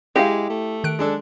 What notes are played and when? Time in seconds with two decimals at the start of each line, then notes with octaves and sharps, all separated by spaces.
0.16 G#3 E4 G4 D#5 F5
0.50 A3
0.84 D#3 F#6 D7
0.99 G#3 D4 A4